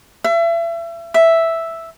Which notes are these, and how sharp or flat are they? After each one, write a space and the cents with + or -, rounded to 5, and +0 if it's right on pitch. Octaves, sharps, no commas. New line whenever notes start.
E5 +35
E5 +0